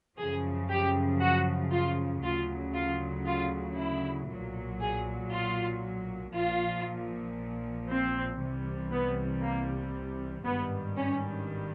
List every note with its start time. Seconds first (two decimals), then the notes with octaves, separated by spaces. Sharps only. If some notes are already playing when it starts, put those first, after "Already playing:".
0.17 F#2 C#3 F3 G#4
0.70 G4
1.21 F#4
1.72 F4
2.23 D2 C#3 F#3 F4
2.75 F4
3.26 F4
3.77 E4
4.29 B1 A#2 F#3
4.80 G#4
5.32 F4
6.34 A#1 A#2 F3 F4
7.88 C4
8.39 C2 C3 E3 G3
8.91 B3
9.42 A#3
10.45 G#1 G2 D#3 G3 B3
10.97 C#4